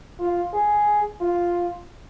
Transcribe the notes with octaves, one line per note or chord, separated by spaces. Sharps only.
F4
G#4
F4